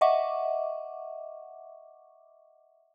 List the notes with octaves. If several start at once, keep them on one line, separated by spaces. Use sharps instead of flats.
D#5 E5 F#5 C#6 D6